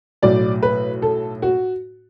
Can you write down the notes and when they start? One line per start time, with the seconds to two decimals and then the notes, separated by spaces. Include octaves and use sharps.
0.22 B1 A2 F#3 D5
0.63 B4
1.02 A4
1.42 F#4